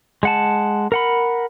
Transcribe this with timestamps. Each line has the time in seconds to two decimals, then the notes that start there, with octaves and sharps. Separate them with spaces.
0.23 G#3 F#5 A5
0.92 A#4 F#5 B5